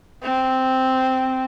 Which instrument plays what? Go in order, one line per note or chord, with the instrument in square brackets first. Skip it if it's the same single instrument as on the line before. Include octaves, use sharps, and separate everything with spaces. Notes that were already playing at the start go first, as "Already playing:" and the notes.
[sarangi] C4